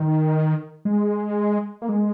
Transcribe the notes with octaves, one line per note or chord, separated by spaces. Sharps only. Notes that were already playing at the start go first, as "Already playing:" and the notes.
Already playing: D#3
G#3
A#3
G#3